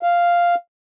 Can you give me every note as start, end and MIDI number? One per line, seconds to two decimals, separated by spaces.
0.03 0.55 77